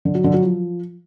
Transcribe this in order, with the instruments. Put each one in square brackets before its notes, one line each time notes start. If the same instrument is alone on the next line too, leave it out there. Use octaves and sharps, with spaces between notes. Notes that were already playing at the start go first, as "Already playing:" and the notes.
[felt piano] D3
F#3
D3
F#3
F3